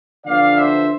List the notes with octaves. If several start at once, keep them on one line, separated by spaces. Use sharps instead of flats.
D3 F3 B3 D5 F5
C5 E5